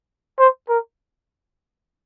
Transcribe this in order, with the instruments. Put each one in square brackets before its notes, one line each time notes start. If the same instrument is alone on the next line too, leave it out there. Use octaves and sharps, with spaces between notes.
[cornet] C5
A#4